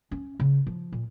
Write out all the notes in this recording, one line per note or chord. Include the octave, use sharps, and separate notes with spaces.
C#4
C#3
F3
A#2